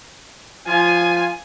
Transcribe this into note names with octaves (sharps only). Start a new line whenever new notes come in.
F3 F4 G#5